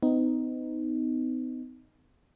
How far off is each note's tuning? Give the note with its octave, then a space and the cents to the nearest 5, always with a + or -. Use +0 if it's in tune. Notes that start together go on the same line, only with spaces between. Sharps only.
B3 +45 D#4 +0